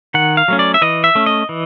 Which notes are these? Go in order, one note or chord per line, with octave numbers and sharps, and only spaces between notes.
D#3 F#5
F5
F#3 A3 C#4
D5
E5
E3 D#5
E5
A3 C#4
D#5
E3